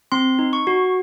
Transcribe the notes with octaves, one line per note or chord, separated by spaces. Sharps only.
C4 C6
D#4
C#6
F#4